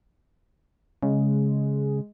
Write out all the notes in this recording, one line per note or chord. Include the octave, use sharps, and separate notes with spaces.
C#3 G#3